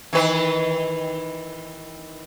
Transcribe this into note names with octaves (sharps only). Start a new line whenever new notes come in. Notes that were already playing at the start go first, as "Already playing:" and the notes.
D#3 E3 B4